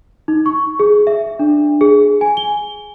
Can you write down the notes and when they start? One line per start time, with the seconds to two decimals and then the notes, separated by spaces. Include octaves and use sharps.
0.28 D#4
0.46 C#6
0.80 G#4
1.07 E5
1.39 D4
1.81 G#4
2.21 G#5
2.37 G7